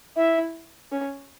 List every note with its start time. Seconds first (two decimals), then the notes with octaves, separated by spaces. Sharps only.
0.16 E4 E5
0.92 C#4